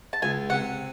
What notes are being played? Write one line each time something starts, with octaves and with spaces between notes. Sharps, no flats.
A5
C#2 G#5
C3 F#5